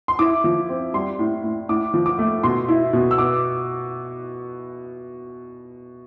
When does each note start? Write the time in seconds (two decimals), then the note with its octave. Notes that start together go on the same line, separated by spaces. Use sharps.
0.08 C6
0.19 E4 D6
0.44 F3
0.69 C4
0.94 G3 C6
1.19 A2
1.44 A2
1.69 A2 D6
1.94 F3
2.06 D6
2.19 A3
2.44 B2 C6
2.69 E4
2.93 B2
3.11 E6
3.18 B3 D6